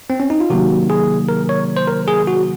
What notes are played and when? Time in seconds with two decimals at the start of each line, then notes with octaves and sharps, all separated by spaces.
0.10 C4
0.20 C#4
0.30 D#4
0.40 F4
0.50 C3 D#3 F#3 A#3 F#4
0.90 G#4
1.29 A#4
1.49 C#5
1.77 C5
1.88 A#4
2.08 G#4
2.27 F#4